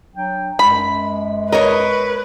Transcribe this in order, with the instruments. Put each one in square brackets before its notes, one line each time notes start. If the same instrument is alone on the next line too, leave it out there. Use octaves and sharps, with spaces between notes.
[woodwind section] F#3 D4 G5
[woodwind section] F#2 G#3 [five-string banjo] B5
[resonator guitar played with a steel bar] A#4 C#5 [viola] B4 [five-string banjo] D#5